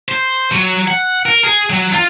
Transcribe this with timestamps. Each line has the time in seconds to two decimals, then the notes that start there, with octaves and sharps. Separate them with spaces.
0.09 C5
0.52 F#3
0.88 F#5
1.26 A#4
1.44 G#4
1.70 F#3
1.93 F4